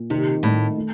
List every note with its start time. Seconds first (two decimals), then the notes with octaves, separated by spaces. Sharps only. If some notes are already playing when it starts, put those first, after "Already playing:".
Already playing: A#2
0.10 C3 D#3
0.43 A2 A3
0.76 A3